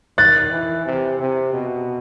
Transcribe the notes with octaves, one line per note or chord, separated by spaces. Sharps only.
D#3 F#6 A6
E3
C3
C3
B2